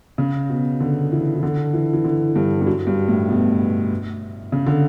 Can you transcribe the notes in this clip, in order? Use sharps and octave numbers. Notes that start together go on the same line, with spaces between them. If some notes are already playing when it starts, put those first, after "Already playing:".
C#3
B2
D3
E3
E3
D3
E3
E3
D3
G2
G2
F#2
G2
A2
B2
C#3
D3